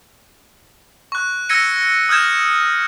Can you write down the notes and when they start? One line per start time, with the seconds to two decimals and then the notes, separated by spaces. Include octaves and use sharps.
1.12 C#6 F#6
1.49 E6 G#6 A#6 C#7 D#7
2.09 D#6 F6 G6 G#6 E7